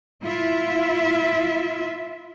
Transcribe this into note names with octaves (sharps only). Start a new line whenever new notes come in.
E4 F4 E5